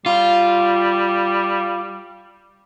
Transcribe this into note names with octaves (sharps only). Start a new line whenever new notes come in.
G3 F4